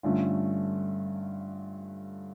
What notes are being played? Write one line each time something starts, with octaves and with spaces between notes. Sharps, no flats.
G2 D3 A3 C#4 F4